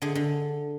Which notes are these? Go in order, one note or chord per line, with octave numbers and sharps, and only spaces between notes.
D3 G#4
D3